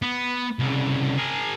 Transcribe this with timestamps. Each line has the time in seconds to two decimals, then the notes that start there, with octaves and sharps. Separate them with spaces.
0.02 B3
0.59 C2 C#3
1.18 G#4 A#4